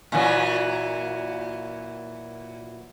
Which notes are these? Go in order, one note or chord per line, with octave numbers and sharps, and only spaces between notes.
A#2 E3 F#3